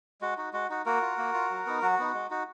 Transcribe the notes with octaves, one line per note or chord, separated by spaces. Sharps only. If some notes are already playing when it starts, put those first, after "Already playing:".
G#3 F#4
D#4 F#4
G#3 F#4
D#4 F#4
A#3 F#4 A#4
F4
A#3
F4
F#3
B3 D#4
F#3 F#4
B3 D#4
G#3
D#4 F#4